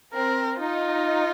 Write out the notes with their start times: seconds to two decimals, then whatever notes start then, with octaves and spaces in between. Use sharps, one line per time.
0.14 C4 A#4
0.60 D#4 F4